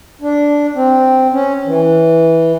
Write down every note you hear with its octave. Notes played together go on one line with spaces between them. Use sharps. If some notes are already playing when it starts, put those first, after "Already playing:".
D4
C4
C#4
E3